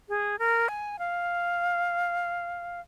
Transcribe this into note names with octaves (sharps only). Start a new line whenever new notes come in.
G#4
A#4
G#5
F5